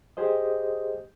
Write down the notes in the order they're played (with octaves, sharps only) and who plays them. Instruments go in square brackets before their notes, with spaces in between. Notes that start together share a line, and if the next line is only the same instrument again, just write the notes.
[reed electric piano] G4 G#4 C5 D#5